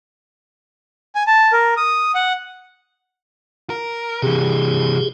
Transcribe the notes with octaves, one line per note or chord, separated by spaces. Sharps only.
G#5
A5
A#4
D#6
F#5
A#4
C3 E3 G4 G#4